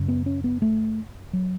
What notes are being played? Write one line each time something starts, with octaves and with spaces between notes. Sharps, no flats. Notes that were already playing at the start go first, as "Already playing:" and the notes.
Already playing: F#2 C#3
B3
C#4
B3
A3
F#3